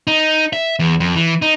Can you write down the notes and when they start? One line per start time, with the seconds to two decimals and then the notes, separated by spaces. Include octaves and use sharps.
0.07 D#4
0.53 E5
0.79 E2
1.00 F2
1.16 E3
1.42 D#4